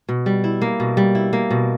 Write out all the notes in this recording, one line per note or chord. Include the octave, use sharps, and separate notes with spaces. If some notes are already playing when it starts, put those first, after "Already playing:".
B2
G3
E4
A#3
B2
G3
E4
A#3
B2